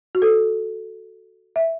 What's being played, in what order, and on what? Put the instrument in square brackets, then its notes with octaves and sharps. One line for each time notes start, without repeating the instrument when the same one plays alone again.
[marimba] F#4
A4
E5